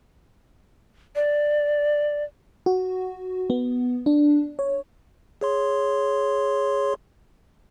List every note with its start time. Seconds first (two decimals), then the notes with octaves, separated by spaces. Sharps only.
1.15 D5
2.66 F#4
3.50 B3
4.06 D4
4.59 C#5
5.41 G#4 C#5 C6